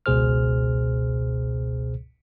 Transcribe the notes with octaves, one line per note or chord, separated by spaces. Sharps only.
G#1 C#2 B2 G#4 C5 F6